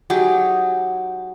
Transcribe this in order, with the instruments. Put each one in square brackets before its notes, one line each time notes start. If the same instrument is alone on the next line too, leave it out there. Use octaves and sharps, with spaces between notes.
[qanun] F#3 D#4 G4 G#4